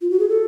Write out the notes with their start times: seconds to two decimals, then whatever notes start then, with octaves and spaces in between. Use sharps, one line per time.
0.02 F4
0.10 F#4
0.20 G#4
0.29 A4